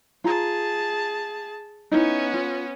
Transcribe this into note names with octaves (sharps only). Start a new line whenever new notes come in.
F4 G#4 A5 A#5
B3 C#4 D#4 E4
F4